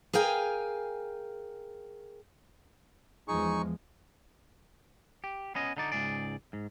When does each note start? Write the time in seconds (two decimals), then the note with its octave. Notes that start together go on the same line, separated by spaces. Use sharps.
0.13 G#4 A#4 F5 G5 G#5
3.28 E2 F3 G#3 D#4 G#4 C#6
5.24 G4
5.55 B3 C#4 D#5
5.77 D3 D#4 D5
5.92 C#2 G#2 G#4 D5
6.53 G#2